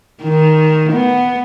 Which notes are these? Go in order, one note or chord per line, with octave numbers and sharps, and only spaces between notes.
D#3
B3